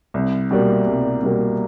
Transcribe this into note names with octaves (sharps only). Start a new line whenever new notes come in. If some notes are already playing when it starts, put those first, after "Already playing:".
C2
B2 G3 A#3
C2
B2 G3 A#3